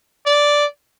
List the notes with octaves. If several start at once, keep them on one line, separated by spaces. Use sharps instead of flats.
D5